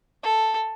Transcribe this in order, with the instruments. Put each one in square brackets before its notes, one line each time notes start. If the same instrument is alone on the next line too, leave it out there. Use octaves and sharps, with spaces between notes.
[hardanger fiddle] A4